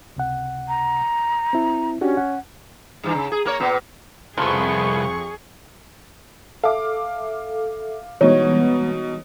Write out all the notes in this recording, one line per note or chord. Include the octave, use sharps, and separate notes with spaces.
C#2 C3 F#5
A#5
C4 E4
C#4 D4 F#4 G4
F#5
G2 E3
C#3
G#4
A#3 A#4 C#5
A#2 B3
C2 F2 F3 B3 G#4 C#6
A4 E5 F5 D6
B2 E3 G3 G#3 B3 D#4 C#5